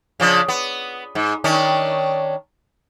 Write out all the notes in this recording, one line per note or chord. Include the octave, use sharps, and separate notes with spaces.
C#3 F3 D4
B3
G#2
D#3 C#4 D4